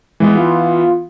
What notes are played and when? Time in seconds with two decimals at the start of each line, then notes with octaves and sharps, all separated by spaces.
0.20 E3 G#3 B3
0.35 F4